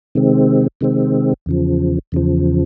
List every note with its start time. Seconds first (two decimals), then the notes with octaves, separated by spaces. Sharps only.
0.15 C3 D#3 G#3 C4
0.81 C3 D#3 G#3 C4
1.46 E2 C#3 F3
2.12 E2 C#3 F3